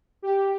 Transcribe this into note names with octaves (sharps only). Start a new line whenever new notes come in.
G4